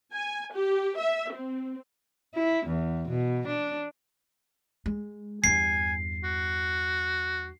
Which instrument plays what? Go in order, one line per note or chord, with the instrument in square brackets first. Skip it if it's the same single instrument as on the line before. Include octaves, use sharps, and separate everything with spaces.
[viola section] G#5
G4
E5
C4
[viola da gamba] E4
E2
B2
D4
[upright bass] G#3
[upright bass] E2 G2 [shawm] G#5 [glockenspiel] C7
[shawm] F#4